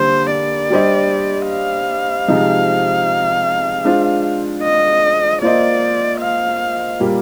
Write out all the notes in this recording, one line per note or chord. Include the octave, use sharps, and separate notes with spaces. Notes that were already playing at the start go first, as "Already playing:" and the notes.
Already playing: D3 G3 A#3 C5
D5
G3 D4 G4 C5 D#5
F5
C3 F3 G#3 C4 D#4
G#3 D4 F4 C5
D#5
A#3 F4 C5 D5 D#5
F5
A#2 G3 A#3